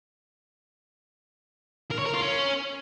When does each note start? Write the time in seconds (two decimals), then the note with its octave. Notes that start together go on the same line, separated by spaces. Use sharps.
1.91 A#4
1.99 C#5
2.06 A#4
2.14 F4
2.22 C#4